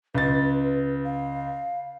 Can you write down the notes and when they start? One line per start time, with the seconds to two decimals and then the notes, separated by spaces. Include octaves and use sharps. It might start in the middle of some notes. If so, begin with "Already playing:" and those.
0.15 C#2 B4 A6
1.04 F5